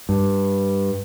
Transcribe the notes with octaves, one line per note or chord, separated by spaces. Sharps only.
G2